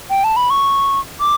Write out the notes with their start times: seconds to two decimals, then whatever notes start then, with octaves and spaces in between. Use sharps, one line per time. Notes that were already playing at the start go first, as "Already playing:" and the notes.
0.10 G5
0.24 A5
0.37 B5
0.50 C#6
1.20 D6